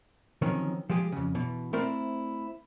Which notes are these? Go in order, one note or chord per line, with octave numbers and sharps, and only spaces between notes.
D3 D#3 F3 F#3 C4 C#4
F3 G#3 G4 G#4
F2 C#3
B2 E3
A3 C4 E4 A#4 C5 D5